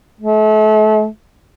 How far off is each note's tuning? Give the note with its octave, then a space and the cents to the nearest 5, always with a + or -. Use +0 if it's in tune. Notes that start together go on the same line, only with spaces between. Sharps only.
A3 -35